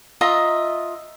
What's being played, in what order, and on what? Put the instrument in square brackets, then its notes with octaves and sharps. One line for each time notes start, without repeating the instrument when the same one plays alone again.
[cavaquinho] F4 D#5 E5 A#5